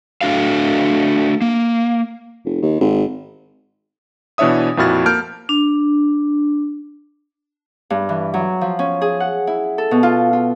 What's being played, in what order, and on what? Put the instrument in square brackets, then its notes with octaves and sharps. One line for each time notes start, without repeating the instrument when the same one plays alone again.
[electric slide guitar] A3 D4 F#4 F5
A#3
[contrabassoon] F1
D#2
G#1
[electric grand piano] B2 E3 D4 C#5 E5 D#6
F2 A#2 E4 F#4 F6 A6
A#3 A5 F6 G6 D7
[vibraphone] D4
[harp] G2
E3
F#3
F3
C#4
G#4
F#5
E4
A4
B2
F4
F4